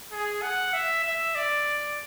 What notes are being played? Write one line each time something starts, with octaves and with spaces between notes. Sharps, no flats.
G#4
F#5
E5
E5
D5